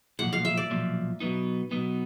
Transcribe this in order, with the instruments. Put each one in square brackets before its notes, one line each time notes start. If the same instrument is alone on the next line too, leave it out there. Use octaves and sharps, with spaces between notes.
[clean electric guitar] B1 A#2 F3 [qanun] F#5
[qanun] F5
E5
D5
[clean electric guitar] B1 A#2 F3
B2 F#3 B3 D#4
B2 F#3 B3 D#4